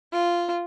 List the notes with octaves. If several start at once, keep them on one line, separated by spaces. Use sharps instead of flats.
F4